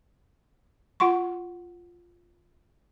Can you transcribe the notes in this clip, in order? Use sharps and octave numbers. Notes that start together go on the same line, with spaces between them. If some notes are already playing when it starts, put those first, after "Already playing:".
F4 F#5 C6 C#6